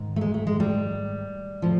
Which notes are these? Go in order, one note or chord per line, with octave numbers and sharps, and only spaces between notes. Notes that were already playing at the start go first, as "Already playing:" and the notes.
Already playing: G#2 D#3
A3
G#3
A3
G#3
G3
A2 F3